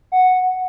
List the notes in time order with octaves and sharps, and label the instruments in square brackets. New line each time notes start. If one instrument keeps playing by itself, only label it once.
[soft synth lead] F#5